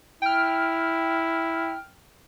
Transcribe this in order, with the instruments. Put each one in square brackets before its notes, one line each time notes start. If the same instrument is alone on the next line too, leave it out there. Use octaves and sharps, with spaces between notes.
[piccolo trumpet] E4 [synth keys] G5 F6